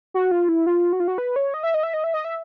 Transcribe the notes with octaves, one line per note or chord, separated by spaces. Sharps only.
F#4
F4
E4
F4
F#4
F4
F#4
B4
C#5
D#5
E5
D#5
E5
D#5
E5
D#5
E5